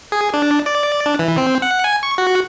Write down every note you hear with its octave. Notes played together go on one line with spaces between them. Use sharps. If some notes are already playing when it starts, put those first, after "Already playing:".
G#4
D4
D5
D4
E3
C4
F#5
G#5
C#6
F#4